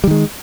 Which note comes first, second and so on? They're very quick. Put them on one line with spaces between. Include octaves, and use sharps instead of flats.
G3 D#3 G#3